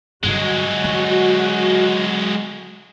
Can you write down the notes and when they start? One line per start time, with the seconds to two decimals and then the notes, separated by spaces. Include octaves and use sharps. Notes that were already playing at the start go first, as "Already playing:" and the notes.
0.23 G2 D3 F#3 G#3 F#4
0.84 D3